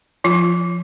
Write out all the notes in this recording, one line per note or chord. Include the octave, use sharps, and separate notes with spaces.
F3 F4